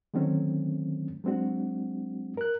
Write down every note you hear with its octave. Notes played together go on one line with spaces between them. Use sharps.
D3 D#3 F#3 A3 C4 C#4
F#3 G#3 C4 D4 F#4
A#4 F#6